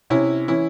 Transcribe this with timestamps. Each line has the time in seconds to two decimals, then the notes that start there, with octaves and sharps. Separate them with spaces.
0.10 C3 C#4 E4
0.48 E3 C#4 E4